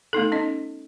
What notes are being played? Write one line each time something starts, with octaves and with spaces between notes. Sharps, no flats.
A3 B3 D#4 A4
C#4 D#4 D#5